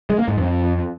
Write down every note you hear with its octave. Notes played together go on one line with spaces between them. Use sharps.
G#3
A#3
G#2
F2